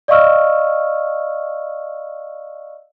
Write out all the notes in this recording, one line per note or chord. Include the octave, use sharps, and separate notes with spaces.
D5 D#5 F5 C#6 E6 F6